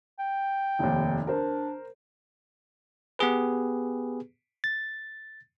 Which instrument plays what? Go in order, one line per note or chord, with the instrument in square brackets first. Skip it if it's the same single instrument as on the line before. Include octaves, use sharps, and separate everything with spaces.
[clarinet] G5
[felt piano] F1 D#2
[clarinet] D4 [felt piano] A#4 C5
[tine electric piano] B3 G4 G#4 B4
A6